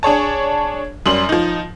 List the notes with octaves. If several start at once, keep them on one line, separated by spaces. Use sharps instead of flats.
D4 G#4 C#5 A5
F#2 G3 C6 F#7
F3 D#4